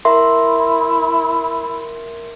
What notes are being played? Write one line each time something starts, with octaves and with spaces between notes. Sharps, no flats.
E4 A#4 E5 C6